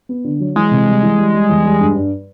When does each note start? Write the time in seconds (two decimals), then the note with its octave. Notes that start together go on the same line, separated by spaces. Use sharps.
0.09 B3
0.24 D3
0.40 F#3
0.56 E3 G#3
0.71 C3
0.87 G3
1.03 E3
1.18 G3
1.33 G3
1.49 E2
1.65 G3
1.80 G2
1.95 G2